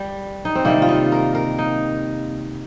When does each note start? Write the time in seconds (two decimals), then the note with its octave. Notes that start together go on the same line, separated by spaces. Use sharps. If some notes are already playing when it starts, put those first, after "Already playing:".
Already playing: G3
0.45 D#4
0.55 C4
0.65 C3 D#3 G3 A#3
0.82 F4
0.89 D#4
1.12 A#4
1.35 A#4
1.58 D#4